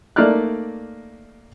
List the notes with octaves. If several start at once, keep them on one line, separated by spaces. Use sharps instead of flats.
A3 A#3 D#4 D5 F6 F#6